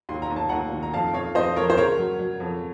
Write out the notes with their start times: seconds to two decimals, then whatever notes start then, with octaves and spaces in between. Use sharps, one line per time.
0.09 D#2 C6
0.22 A#5
0.31 D#2
0.36 A5
0.49 D#2 F#5 A#5
0.72 D#3
0.83 A#5
0.93 F2 F5 A5
1.14 F2 C#5 F5
1.35 F2 C5 D#5
1.56 F2 A#4 C#5
1.70 C5
1.77 C#3 A#4 C#5
1.98 F#3
2.19 F#3
2.40 F2